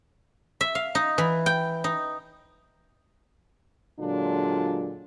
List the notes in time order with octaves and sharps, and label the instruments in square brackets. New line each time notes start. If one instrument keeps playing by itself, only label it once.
[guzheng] E5
F5
D#4
E3
G5
D#4
[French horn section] A#2 D3 F#3 G#3 D4 F4